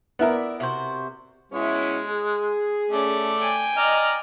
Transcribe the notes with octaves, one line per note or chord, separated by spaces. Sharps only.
B3 E4 A#4 D5 E5
C3 F#4 C5
B2 G#3 C#4 E4
G#4
A3 C#4 D5
G5 G#5
D5 D#5 A#5 F6